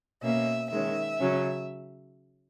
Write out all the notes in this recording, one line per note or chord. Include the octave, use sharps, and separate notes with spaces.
B2 A#3 C#4 E5
D#3 G#3 C#4 E5
C#3 F#3 C#4